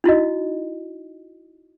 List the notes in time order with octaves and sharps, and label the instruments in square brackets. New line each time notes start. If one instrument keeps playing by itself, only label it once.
[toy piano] D#4 E4 F#4 D#5